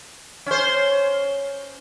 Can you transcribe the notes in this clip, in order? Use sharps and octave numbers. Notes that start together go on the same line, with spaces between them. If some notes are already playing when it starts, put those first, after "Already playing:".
C#4 C5